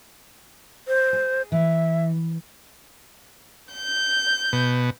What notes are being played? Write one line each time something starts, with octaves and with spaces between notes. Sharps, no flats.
C5
G#4
E3 E5
G6
B2